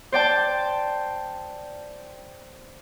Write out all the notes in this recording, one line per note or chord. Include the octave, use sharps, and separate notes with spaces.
C5 D5 G5 A5